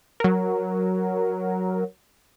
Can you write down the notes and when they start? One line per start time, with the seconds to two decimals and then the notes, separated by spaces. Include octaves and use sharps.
0.20 F#3 A#4